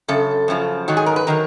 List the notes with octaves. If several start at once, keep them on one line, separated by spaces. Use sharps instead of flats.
F#2 C#3 A4
F#2 C#3 F3
G#2 D#3 F#3 F#4
G#4
A#4
B4
D#3 F#3 A#4